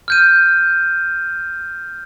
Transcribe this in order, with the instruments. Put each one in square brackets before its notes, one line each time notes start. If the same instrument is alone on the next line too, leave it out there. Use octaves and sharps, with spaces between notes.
[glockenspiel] F6 G6 D#7